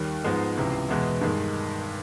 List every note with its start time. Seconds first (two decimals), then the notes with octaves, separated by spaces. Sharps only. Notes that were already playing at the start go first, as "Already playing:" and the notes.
Already playing: D#2 D#3 G3
0.24 G#2 F3 G#3 B3 D#4
0.57 C#2 C3 E3
0.89 E2 B2 G#3 B3 E4
1.21 G2 D#3 G#3